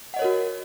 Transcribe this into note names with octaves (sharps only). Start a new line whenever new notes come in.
F#4 A#4 C#5 D#5 F#5